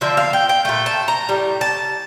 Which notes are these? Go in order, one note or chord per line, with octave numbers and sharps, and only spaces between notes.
D3 F3 A#3 E5
F5
G5
G5
A#2 A3 G5
A5
A#5
A2 G3
A5